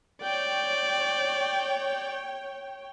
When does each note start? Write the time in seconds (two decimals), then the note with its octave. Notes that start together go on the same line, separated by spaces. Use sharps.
0.23 C#5 D5 G5